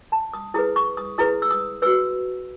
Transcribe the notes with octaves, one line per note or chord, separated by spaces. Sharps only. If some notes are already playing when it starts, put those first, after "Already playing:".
A5
D#6
E4 G#4 B4 D#6
C#6
D#6
E4 G#4 B4 D#6
E6
D#6
F#4 B4 E6